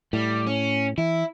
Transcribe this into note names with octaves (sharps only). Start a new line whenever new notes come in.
A2 G3
C#4
E3 E4